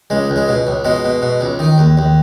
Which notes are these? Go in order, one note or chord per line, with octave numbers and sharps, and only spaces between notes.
C#2 G#3
C#2
G#3
B2
C#2
B2 G#3
B2
B2
C#2
D#3
D#2
D#2